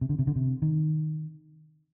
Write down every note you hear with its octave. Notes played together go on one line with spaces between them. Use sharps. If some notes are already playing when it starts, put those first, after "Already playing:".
C3
D3
C3
D3
C3
D#3